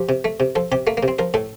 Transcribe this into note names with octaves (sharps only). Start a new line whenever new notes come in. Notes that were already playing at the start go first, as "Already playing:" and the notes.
Already playing: F3 G4
C3
A3
C3
F3 A4
C3 G4
A3 A#3
A#3
C3
C4
F3 A#4
A2 A4